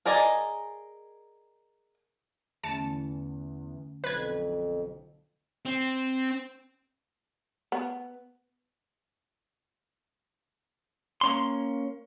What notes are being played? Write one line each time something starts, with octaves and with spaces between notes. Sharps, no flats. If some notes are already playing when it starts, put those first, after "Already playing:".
G#4 A#4 D5 D#5 G#5
E2 D3 A3 C#4 A5 C#7
B1 F2 B4 G#6
C4
B3
A#3 C#4 C6